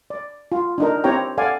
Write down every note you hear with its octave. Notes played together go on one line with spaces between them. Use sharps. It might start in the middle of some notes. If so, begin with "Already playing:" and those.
D5
F4
D4 D#4 A#4
C4 E4 G4 C#5 G5 A#5
A4 D5 F5 F#5 G#5